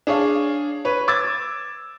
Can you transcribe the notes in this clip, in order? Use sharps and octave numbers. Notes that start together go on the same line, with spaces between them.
D4 G#4 C#5 F5
B4 C#5
D6 E6 G#6 A6